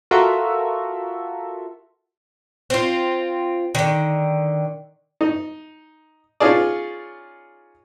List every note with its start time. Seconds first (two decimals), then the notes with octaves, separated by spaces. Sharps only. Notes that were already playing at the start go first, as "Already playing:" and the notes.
0.11 F4 F#4 A4 A#4 E5
2.70 C4 F4
3.75 D3 D#3
5.21 D#4
6.40 C#4 D#4 F4 G#4 D5